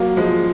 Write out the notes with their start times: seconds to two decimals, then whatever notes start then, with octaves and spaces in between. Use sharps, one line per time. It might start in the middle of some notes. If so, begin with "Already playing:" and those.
Already playing: F#3 A#3
0.17 F3 G#3